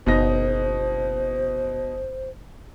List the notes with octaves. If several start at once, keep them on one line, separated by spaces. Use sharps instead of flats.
F#1 B2 D#4 C5 A#6